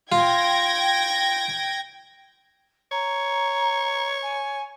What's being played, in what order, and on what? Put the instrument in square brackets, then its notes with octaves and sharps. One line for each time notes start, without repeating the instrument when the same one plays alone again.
[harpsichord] F4 [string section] G5 G#6 A#6
[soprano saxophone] C#5 [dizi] A#5
[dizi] G#5